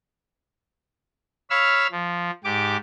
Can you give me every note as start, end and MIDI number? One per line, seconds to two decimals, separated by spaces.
1.50 1.87 73
1.50 1.87 77
1.50 1.87 83
1.50 1.87 88
1.50 1.87 89
1.92 2.31 53
2.44 2.77 44
2.44 2.77 67
2.44 2.77 86